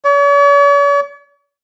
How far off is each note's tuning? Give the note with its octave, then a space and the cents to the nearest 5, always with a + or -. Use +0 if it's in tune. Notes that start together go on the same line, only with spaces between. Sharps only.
C#5 +45